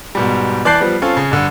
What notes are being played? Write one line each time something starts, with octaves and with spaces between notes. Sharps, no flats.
G#2 B2 G3
E3 D5 A5 F#6 G6 C7
F3 G3 B3
C4 C#4 F4 A4
C#3
G2 D3